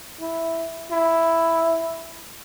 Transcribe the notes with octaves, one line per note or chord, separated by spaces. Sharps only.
E4
E4